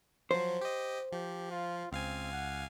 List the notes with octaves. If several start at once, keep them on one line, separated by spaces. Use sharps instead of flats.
F3 F#3 C5
G4 D#5
F3 G4
F4
C#2 C4 F5 G#5
F#5